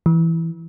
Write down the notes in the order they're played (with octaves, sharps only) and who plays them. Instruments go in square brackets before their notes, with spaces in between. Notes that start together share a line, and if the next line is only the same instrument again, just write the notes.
[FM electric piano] E3